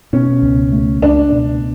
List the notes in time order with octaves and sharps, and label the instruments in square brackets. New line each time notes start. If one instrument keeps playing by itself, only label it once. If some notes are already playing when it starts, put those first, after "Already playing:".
[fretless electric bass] B2 [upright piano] C#4
[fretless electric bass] C#2
A3
[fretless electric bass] C#2 [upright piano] D4
[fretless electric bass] B2